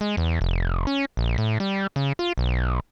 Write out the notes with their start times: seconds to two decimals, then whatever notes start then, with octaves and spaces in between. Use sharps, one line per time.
0.01 G#3
0.17 E2
0.41 F1
0.87 C#4
1.17 A#1
1.38 A2
1.60 G3
1.96 C#3
2.19 F4
2.38 B1